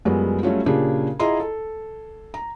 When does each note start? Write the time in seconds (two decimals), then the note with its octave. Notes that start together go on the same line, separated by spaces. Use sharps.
0.05 F#2 F3 G3 G#3 B3
0.43 F#3 G3 A3 C#4 F4 F#4
0.66 A#2 C#3 D4 G4 G#4 A#4
1.19 E4 F4 G#4 D#5 A#5 C6
1.40 A4
2.34 A#5